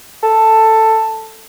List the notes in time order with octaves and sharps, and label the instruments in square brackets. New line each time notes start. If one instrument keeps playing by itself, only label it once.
[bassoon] A4